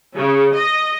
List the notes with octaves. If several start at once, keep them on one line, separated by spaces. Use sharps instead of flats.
C#3
D#5